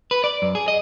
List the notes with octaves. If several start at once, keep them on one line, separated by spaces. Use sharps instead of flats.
B4
D5
F#2
G#4
D#5